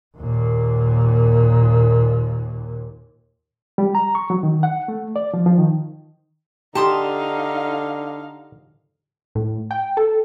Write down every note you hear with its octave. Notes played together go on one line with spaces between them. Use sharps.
D#2 A#2
G3
A#5
C#6
F#3
D#3
F#5
A3
D5
F3
F3
D#3
D3 D#4 G4 F5 A5 C6 D#6
A2
G5
A4